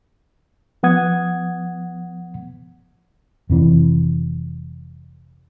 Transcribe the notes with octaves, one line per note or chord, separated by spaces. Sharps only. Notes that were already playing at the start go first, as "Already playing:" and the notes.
F3 B3 F#5 D#6 G#6
F1 C3 E3